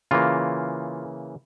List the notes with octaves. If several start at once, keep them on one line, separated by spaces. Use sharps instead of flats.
C#3 E3 A#3 F4